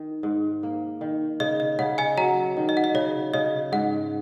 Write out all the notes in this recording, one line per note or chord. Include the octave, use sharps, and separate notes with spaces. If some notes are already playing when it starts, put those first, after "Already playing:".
Already playing: D#3
G#2
A#3
D#3
C#3 D#5
D#5
C#3 F#5
D#5 G#5
F#3 F#5 A#5
D#3
D#5
F#5
D#5
C#3 C#5
C#3 D#5
G#2 F#5